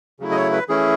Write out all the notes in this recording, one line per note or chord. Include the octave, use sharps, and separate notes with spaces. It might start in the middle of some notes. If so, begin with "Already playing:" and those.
C#3 F#3 A3 E4
D#5
C#5
B4
E3 A3 C#4 E4 G#4